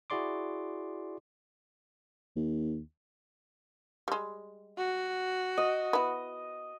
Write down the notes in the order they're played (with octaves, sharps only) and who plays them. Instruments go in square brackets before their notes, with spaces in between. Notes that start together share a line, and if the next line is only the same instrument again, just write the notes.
[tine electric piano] E4 F#4 G#4 D5 C6 D6
[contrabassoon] D#2
[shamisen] G3 G#3
[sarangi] F#4
[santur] D#5
[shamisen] B3 E4